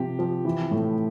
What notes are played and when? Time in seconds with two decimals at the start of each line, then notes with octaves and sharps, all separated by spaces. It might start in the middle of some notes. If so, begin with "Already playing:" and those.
Already playing: C3 F3 G4
0.19 F3
0.45 E3
0.71 A2